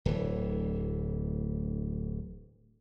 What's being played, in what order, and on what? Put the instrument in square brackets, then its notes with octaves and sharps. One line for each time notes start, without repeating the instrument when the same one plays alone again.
[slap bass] D1 D2 E3